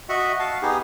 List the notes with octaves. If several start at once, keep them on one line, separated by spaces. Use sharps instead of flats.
F#4 D#5 E5 F#5
F5 A5
B3 D#4 G4 G#4